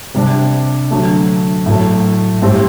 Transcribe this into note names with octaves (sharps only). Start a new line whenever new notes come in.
C3 G3 D4
D3 F#3 A3
A2 F#3 A3
A2 G3 C4 G4